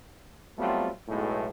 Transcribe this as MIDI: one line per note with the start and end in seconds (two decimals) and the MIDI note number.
0.58 0.88 54
0.58 0.88 55
0.58 0.88 57
0.58 0.88 59
0.58 0.88 60
0.58 0.88 65
1.07 1.46 35
1.07 1.46 45
1.07 1.46 56